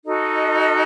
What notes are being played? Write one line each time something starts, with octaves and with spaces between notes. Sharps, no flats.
D#4 F#4 A4 D#5